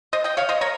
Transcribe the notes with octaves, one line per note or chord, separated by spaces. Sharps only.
C5 D#5
D#5 G5
C#5 F5
C5 D#5
A#4 C#5